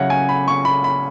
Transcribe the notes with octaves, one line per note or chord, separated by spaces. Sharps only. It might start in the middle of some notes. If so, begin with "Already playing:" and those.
Already playing: C#3 F#3 E4 C#5 F#5
G#5
B5
C#6
B5
B5